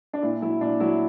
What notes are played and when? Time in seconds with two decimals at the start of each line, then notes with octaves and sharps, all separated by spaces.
0.13 D4
0.22 A#2 E4
0.42 F#3 E4
0.61 A#2 D4
0.80 F#3 E4